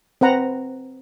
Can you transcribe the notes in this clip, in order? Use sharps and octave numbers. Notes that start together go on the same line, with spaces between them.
C4 B4 F#5 A#5